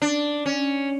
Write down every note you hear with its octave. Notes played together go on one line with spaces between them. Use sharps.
D4
C#4